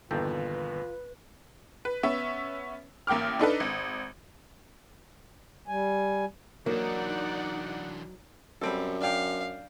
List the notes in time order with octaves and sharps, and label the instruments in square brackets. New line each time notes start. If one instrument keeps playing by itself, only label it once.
[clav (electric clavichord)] G1 A4 G5 [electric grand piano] E2 A#2 D#3 [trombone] F4 [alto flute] B4
[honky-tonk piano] B4
B3 C#4 E5
A1 A#3 G5 D6 F6
D4 D#4 A4 B4
G#1
[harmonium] G3 G#5
[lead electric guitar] E3 D4 [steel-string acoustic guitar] F#3 [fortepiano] A#3 [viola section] D#4 D5 F#5
[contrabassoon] F#2 [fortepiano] G3 C4 A4
[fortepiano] D4 G5 [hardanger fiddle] F5